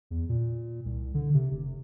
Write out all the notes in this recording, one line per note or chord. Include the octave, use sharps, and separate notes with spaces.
E2
A#2
C2
D3
C3
F1